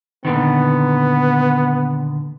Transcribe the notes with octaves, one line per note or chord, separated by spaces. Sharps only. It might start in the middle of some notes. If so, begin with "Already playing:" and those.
A#2 D3 D#3 B3